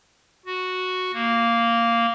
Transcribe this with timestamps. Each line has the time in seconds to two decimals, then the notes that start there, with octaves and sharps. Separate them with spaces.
0.46 F#4
1.14 A#3